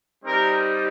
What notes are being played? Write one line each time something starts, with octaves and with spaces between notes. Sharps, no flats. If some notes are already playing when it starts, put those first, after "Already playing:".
G3 C4 D#4 A#4